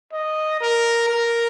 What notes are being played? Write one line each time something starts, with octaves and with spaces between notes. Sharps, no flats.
D#5
A#4
A#4